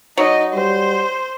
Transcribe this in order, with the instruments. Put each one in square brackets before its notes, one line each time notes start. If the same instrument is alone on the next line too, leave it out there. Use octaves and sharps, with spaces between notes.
[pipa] F#3 [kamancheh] D#4 D#5
[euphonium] G3 [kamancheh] C5